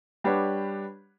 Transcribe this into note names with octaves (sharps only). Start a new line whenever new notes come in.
G3 D4 G4 B4 C#5 F#5